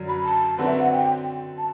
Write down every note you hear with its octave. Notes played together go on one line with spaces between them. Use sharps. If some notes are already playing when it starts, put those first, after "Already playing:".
Already playing: F#2 D3 F#3
B5
A5
D3 F#3 C4 F#4 B4
E5
F#5
G5
A5